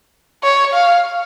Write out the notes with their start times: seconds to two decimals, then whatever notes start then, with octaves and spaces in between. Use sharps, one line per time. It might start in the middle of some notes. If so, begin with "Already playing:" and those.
0.43 C#5
0.74 F5